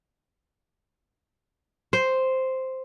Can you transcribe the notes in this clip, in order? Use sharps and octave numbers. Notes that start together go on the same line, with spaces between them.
C5